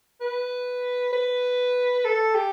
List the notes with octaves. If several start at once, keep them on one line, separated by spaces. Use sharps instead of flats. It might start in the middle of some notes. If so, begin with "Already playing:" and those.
B4
B4
A4
G4